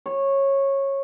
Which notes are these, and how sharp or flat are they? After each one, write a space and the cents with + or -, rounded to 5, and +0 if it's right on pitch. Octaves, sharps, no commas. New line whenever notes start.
C#5 -15